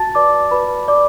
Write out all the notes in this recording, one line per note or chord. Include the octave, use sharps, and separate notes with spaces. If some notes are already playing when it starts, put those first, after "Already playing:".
Already playing: F#4 A5 A6
B4 D5 D6
F#4 B4 B5
B4 D5 D6